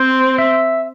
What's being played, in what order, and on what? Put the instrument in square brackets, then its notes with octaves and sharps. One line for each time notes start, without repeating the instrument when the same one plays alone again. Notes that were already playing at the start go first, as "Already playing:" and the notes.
Already playing: [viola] C4 [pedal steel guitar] C5
[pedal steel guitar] E5